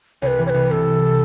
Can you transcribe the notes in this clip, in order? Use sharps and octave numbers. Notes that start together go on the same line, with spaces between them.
C2 C#5
B4
E3
C#5
C2 B4
C3 A4